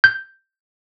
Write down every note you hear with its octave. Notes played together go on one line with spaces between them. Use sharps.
G6